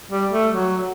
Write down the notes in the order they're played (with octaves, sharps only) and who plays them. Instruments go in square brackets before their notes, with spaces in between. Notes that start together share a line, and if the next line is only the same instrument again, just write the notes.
[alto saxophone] G3
A3
F#3